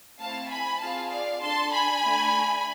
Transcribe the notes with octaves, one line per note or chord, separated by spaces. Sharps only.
A3 C4 E4 F5 A5
G#5 B5
C4 F4 G#4 F5 A5
D5 F5
D4 A4 A5 C6
G#5 B5
A3 D4 A4